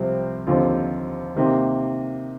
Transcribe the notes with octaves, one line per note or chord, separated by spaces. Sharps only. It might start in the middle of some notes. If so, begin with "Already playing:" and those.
Already playing: C2 C3 F3 C4
D#2 D3 F3 C4 F4
C3 D#3 A#3